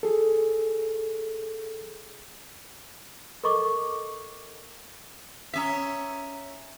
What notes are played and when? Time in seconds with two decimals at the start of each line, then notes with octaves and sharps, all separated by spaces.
0.03 G#4 A4
3.44 A4 A#4 D#5 C#6 D6
5.54 C#4 E5 A#5 D#6 B6